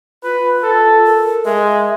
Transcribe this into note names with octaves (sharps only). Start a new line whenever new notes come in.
F4 B4
A4
A#4
G#3 E5